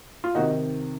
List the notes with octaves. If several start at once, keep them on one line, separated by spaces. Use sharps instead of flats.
F4
C3 D#3 D#4 F#4